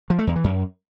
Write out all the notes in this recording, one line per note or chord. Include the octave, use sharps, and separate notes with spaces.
F3
A3
E2
E3
F#2